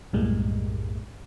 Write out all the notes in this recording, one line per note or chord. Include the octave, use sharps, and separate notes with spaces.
B1 F#2 A2 G3 G#3 A#3